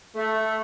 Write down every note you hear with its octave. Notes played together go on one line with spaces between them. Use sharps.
A3